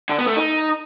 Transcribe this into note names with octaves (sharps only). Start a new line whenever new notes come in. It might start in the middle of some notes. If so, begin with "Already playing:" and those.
D3
B3
A3
D#4